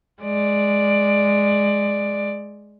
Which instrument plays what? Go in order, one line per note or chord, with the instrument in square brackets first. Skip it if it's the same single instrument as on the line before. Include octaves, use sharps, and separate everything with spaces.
[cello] G#3 D5